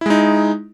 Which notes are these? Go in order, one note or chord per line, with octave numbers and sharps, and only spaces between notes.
G#3 D#4 E4